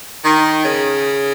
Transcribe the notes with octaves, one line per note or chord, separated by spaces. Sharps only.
D#3
C#3